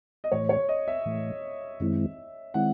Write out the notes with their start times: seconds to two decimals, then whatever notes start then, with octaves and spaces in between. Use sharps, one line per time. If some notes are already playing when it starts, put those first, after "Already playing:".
0.24 D#5
0.32 A2 E3 A3 C#5
0.49 C#5
0.69 D#5
0.88 E5
1.06 A2 E3 A3
1.80 F#2 D#3 G#3 C4 E4
2.54 D#3 G#3 C4 E4 F#5